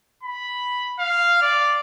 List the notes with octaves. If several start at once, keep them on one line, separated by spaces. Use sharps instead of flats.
B5
F5
D5